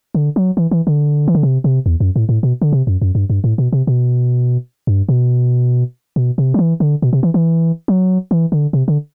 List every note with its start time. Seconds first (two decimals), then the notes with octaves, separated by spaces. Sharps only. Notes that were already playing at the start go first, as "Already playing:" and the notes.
0.15 D3
0.36 F#3
0.57 E3
0.71 E3
0.87 D3
1.28 E3
1.35 D3
1.43 C3
1.64 C3
1.86 E2
2.00 F#2
2.16 A2
2.29 A2
2.43 B2
2.62 D3
2.73 C3
2.87 F#2
3.02 F#2
3.15 G2
3.30 G2
3.44 A2
3.58 B2
3.73 C3
3.87 B2
4.87 G2
5.09 B2
6.16 B2
6.38 C3
6.54 F#3
6.59 E3
6.80 D3
7.02 B2
7.13 C3
7.23 E3
7.34 E3
7.88 F#3
8.31 E3
8.52 D3
8.73 C3
8.88 D3